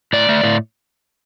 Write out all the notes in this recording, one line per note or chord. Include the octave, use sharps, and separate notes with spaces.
A2 D5
A3
A2